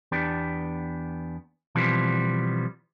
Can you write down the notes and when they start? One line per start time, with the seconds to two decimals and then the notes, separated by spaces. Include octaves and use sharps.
0.12 E2 B3 D4 G4
1.75 B2 E3 F3 G3 B3 C4